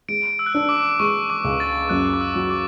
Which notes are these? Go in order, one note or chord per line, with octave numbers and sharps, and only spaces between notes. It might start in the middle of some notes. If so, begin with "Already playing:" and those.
G#3 D7
E6
F#6
D4 E6
D6
G#3 C#6
D6
C#2
A6
F#2 F#6
D6
E6
F#3
D6